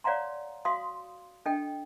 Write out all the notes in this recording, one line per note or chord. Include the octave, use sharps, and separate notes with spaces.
C#5 D5 F5 F#5 A#5 C6
F#4 F5 C6 D#6
D4 A4 D#5 G5